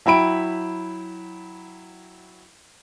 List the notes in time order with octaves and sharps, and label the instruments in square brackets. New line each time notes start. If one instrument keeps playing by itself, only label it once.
[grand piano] F#3 E4 G5 B5 D7